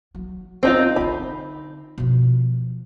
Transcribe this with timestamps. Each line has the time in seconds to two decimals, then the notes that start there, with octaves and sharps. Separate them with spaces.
0.15 F#3
0.63 B3 C4 D#4 F4
0.96 D3 D#4 B5
1.98 B2 F3